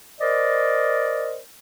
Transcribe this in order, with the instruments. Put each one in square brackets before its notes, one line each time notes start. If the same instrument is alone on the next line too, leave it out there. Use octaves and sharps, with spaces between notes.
[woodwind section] A#4 C5 D5 D#5